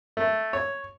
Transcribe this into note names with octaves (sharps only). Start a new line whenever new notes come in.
A3
C#5